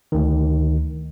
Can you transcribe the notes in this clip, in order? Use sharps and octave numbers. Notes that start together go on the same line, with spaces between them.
D2 D#3